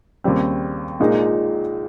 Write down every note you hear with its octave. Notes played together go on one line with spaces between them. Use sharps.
D#2 C#3 G3 C4
A#1 A#2 G#3 D#4